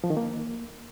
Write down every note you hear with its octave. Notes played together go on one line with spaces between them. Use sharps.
F3
D#3
A#3